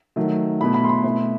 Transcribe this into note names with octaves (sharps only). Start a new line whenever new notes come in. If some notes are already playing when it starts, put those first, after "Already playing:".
D#3 F#3 A3
B2 A3 E4 B5
B5
C6
B5
B2 A3 C4 E4